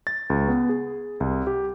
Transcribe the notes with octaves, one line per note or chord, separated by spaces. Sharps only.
A6
C#2
B3
G#4
C2
G4